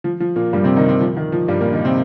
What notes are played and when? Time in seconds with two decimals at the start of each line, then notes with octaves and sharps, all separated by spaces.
0.04 F3
0.20 F3
0.36 A#2 A#3
0.53 G2 G3
0.64 C3 C4
0.77 D#3 D#4
0.88 C3 C4
1.01 F3
1.16 D#3
1.32 F3
1.48 G2 G3
1.61 A#2 A#3
1.73 D#3 D#4
1.84 C3 C4